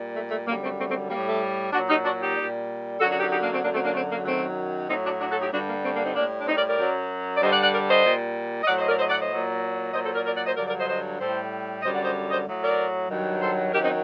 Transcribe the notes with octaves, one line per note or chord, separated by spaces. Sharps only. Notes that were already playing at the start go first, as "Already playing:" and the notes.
Already playing: A#2 G3
A3
A3
F#2 D3 G3 A#3
A3 C4
A3 C4
A3 C4
A2 G3 A#3
A3
A#2 F#3 D4 F#4
D#4 G4
D4 F#4
D#4 G4
A#2 G3
F#2 D3 F#3 F#4 A4
D4 F#4
D#4 G4
D#4 G4
A#3 D4
A3 C4
F#2 D3 F#3 A#3 D4
A3 C4
A#3 D4
A3 C4
A#3
F#2 D#3 F#3 A3 C4
A2 F#3 C4 D#4
D4 F#4
D4 F#4
F#4 A4
D#4 G4
G2 D3 G3 D4 F#4
A#3
A3 C4
A#3 D4
C4 D#4
A2 G3 A#3 D4
D4
C4 D#4
A#4 D5
A#4 D5
F#2 F#3
D5
G2 D3 G3 C5 D#5
D5 F#5
D5 F#5
A#4 D5
C5 D#5
A#2 G3
D#5
A2 F#3 D5 F#5
C5 D#5
A#4 D5
C5 D#5
D5 F#5
C5 D#5
A#2 F#3
A#2 F#3 C5 D#5
A4 C5
A#4 D5
A#4 D5
D5 F#5
C5 D#5
G2 D3 F#3 A#4 D5
A#4 D5
C5 D#5
C5 D#5
A2 G3 A4 C5
F#2 D3 G3 C5 D#5
D5 F#5
C5 D#5
C5 D#5
A2 F#3
A#4 D5
G2 D#3 F#3
A4 C5
F#2 D#3 F#3 G4 A#4
C4 D#4